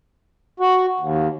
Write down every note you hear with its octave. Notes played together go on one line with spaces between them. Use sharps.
F#4
D#2